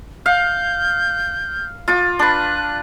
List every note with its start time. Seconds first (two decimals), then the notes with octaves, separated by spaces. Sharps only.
0.26 F5 G6
1.88 F4 D6
2.19 D4 B4 F#6